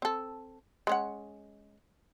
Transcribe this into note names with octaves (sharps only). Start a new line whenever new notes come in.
C4 A4
G#3 C#4 F#5